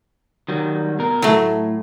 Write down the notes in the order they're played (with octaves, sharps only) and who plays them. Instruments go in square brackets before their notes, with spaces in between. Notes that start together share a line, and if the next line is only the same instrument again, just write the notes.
[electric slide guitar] D#3 F#3 G3
B2 A#4
[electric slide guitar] A2 [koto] F#3 A3